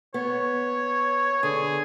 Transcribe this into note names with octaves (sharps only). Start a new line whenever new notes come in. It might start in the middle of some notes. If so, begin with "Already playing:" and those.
B3 C#5
D3 G#4